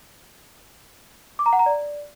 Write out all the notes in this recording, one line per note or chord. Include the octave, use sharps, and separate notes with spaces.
D6
A#5
F#5
A#5
D5